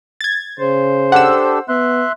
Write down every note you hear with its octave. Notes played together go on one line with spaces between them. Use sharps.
G#6 A6
C#3 C5
D4 G4 A4 F#5 E6
B3 E5 C6 F#6